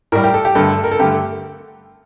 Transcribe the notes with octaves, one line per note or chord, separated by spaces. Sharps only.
A2 G3 A#4
G4
A4
G4
G2 D3 A3 A4
A#4
A4
G2 D3 A3 G4